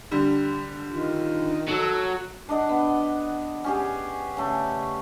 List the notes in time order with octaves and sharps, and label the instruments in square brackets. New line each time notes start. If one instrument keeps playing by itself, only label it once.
[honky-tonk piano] D3 G3
[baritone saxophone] D#3 [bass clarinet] F4
[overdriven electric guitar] F#3 [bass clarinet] A4
[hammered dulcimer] D4 D#5 F#5
B3
C#4 G4 G#4
C#3 A3